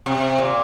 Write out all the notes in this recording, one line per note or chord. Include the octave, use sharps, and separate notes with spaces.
C3
A#2